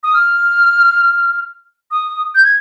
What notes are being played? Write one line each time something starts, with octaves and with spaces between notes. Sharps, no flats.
D#6
F6
D#6
G6
G#6